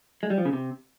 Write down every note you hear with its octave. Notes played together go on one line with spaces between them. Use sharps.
G#3
G3
F3
C#3
C3